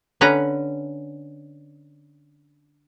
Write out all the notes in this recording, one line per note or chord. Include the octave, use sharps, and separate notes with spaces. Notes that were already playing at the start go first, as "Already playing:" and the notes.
D3 C#4 B4 A#5